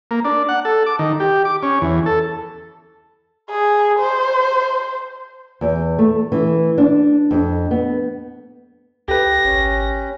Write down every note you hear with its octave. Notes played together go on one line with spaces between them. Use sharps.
A#3
D4
F#5
A4
D6
D#3
G4
D6
C#4
E2
A4
G#4
C5
E2
A3
E3
D4
F2
B3
C#2 G4 B4 A#6
G#1 C#4